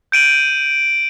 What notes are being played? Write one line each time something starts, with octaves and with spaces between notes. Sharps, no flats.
G6 D7 D#7 F#7